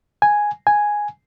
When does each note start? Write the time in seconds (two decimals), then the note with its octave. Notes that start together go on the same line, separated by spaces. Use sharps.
0.22 G#5
0.67 G#5